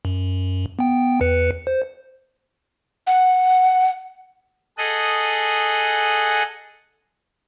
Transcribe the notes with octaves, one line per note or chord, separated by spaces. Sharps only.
F#2
B3 G5
E2 B4 C#7
C5
F#5
G#4 A4 D#5 F#5